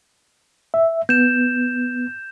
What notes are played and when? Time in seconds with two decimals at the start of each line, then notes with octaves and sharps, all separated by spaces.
0.74 E5
1.09 B3 G6 E7